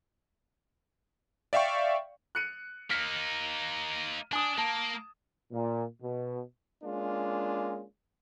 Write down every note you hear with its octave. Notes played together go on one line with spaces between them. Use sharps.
D5 E5 F5 G5 C#6
F#6 C#7 D#7
A#3 D#4 F6 B6 C#7
D4 G#5 D#6
A#3 A5
A#2
B2
G#3 A#3 C#4 D4 F4